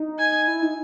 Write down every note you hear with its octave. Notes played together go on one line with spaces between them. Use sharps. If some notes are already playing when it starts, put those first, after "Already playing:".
Already playing: D#4
G#5
E4
D#4